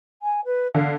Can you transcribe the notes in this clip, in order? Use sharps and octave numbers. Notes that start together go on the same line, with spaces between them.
G#5
B4
D3 F5